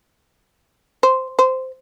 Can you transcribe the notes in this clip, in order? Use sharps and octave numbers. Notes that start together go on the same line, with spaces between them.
C5
C5